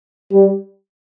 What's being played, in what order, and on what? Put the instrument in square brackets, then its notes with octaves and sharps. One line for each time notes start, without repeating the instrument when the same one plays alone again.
[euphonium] G3